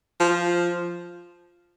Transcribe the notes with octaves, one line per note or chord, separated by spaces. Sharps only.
F3